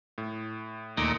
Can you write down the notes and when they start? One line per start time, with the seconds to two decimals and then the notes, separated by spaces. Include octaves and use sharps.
0.18 A2
0.97 D#2 A#2 A3 D#4